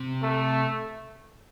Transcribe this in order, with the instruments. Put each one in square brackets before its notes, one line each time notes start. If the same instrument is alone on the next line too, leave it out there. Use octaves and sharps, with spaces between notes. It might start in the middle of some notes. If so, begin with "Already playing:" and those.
Already playing: [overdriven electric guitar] C3
[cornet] A3